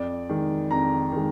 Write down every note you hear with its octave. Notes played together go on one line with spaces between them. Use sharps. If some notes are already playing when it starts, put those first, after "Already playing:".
Already playing: F2 D5
D#3 G#3
F2 A#5
D#3 G#3